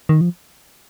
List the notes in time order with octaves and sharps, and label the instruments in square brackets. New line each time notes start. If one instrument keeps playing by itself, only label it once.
[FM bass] D#3
F3